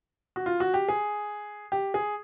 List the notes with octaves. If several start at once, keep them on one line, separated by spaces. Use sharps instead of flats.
F#4
F4
F#4
G4
G#4
G4
G#4